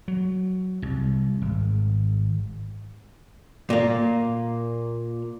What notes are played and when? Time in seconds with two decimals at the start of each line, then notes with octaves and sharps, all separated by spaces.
0.08 F#3
0.82 C2
1.42 G#1
3.70 A#2 A#3